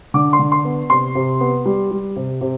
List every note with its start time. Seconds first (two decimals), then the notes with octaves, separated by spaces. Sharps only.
0.14 D3 D6
0.33 C6
0.39 D3
0.52 C6
0.65 B3
0.90 C3 C6
1.15 C3
1.41 B3
1.65 G3
1.91 G3
2.16 C3
2.41 C3